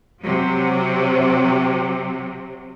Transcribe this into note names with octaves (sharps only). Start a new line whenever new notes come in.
C3 F#3